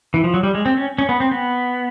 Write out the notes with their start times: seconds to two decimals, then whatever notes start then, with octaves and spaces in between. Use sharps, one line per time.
0.14 E3
0.24 F3
0.34 F#3
0.43 G3
0.55 G#3
0.66 C4
0.77 C#4
0.98 C#4
1.09 B3
1.20 C4
1.31 B3